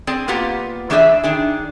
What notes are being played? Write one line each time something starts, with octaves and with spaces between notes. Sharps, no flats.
C4 G#4 D5
A#3 B3 F4 G4 F#5
E3 A3 D4 G#4 D5 E5
D#3 D4 G#4